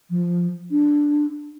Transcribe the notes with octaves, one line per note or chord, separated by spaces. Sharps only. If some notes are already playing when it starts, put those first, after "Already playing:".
F3
D4